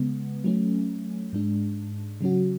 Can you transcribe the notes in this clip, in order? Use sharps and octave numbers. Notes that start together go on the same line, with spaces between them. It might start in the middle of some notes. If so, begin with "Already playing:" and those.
Already playing: C#3 G#3 B3
F#3 A3 C#4
G#2 G#3 D4
C#3 F#3 C#4 F#4